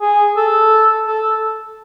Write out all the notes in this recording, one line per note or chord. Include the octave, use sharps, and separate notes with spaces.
G#4
A4
A4